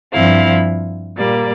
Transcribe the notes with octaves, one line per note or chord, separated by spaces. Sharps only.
G2 F3 C4 E4 F5
A#2 G3 A#3 D5